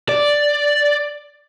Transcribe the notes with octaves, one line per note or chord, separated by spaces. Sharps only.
D5